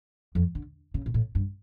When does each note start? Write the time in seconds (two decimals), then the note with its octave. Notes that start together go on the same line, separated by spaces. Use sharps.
0.35 F2
0.55 D3
0.94 C#3
1.06 A#2
1.14 A2
1.35 G2